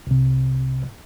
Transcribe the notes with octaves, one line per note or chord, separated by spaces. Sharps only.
C2 C3